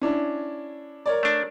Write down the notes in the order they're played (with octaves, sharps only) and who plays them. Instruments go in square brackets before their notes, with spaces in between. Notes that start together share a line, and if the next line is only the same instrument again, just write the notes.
[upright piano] C#4 D4 E4
A#4 C#5 D5
[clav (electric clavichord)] A3 D4